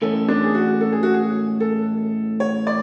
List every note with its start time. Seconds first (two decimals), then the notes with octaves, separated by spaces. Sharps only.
0.02 A2 E3 G#3 C#4 A4
0.28 D4
0.44 G#4
0.55 F#4
0.81 A4
0.92 G#4
1.03 F#4
1.14 G#4
1.60 A4
2.40 C#5
2.67 D5